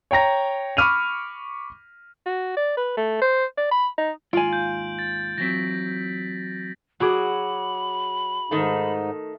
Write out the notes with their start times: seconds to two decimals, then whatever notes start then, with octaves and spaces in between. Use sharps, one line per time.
0.11 C#5 G5 A#5 A#6
0.77 B5 C#6 D6 F6 D#7 F7
2.26 F#4
2.57 D5
2.77 B4
2.97 A3
3.21 C5
3.58 D5
3.71 B5
3.98 D#4
4.33 D#2 G#2 F4 F5 G#5 D7 F#7
4.53 G6
4.99 A6
5.38 E3 F#3 C4 A#6 B6
7.00 F#3 F#4 G#4 B5 D6
8.51 G#2 D#3 A3 D#4